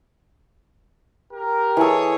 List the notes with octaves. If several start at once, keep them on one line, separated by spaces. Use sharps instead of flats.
G4 A#4
E3 G#4 A4 C#5